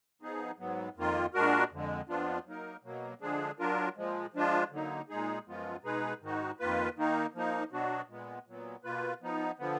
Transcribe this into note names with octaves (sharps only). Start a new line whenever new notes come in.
F3 B3 D#4 G#4
G#2 F#3 B3
F2 D#3 A#3 F4
A#2 G#3 D4 F#4 A#4
F2 D3 G#3
F2 F3 B3 D4 F4
F#3 A#3 D#4 A#4
B2 F#3 A#3
D3 F3 G#3 D4 G#4
F#3 D4 F4 A#4
A#2 F3 G#3
F3 G#3 D4 F4
D3 F#3 A#3 D#4
A#2 G#3 D#4 G#4
F#2 F3 G#3 B3 F4
B2 G#3 D#4 G#4 B4
G#2 D#3 G#3 D#4 F#4
F2 D#3 A#3 F4 B4
D#3 A#3 D#4
F3 A#3 D#4
B2 F#3 B3 D4 F#4
A#2 G#3 B3
A#2 F#3 B3
B2 A#3 F4 B4
F3 B3 D#4
D3 F3 B3